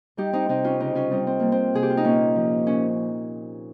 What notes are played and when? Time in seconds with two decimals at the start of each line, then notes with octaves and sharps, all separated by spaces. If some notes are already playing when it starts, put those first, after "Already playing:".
0.17 G3 D#4 G4
0.33 C4 D#4
0.49 C3 C4 D#4
0.64 C#4 F4
0.80 C#3 C4 D#4
0.95 C#4 F4
1.10 G3 C4 D#4
1.27 C4
1.40 G3 A#3
1.52 C4
1.74 C3 G#4
1.83 G4
1.90 F4
1.97 D#4
2.04 A#2 A#3 C#4
2.36 F3
2.67 A#2 C#4